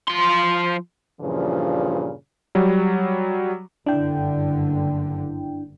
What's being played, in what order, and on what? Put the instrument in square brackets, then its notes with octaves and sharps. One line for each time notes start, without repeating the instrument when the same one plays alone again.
[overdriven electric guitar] F3 C6
[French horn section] G2 A#2 C#3 E3 F3
[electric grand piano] F#3 G3
[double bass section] F#1 G2 D3 [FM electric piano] D4 E4 G5